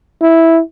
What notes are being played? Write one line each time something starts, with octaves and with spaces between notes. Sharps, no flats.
E4